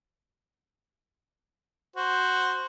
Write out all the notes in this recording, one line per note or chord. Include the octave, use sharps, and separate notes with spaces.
F#4 C5